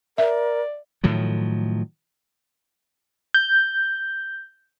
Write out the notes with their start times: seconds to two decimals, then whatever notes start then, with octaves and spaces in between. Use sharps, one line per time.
0.18 A#4 D5 E5
1.04 A2 D#3 F3 F#3
3.34 G6